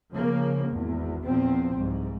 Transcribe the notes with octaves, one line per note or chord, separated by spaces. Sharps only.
C#3 F3 A#3
G#1 E2
E2 A#2 F3 C4
C2 G#2